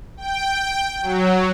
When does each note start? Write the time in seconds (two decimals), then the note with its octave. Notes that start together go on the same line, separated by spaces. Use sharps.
0.17 G5
1.02 F#3